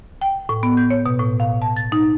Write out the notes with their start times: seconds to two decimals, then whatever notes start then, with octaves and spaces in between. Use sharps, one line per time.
0.21 G5
0.49 A2
0.63 B3
0.77 G6
0.90 C#5
1.06 B2
1.19 A2
1.40 F5
1.62 A5
1.76 A6
1.92 D#4